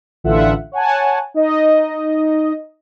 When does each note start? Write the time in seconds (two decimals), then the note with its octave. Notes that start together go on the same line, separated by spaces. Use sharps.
0.24 A1 D3 E3 F4 E5 F#5
0.72 C#5 F#5 G#5 A5
1.34 D#4 D#5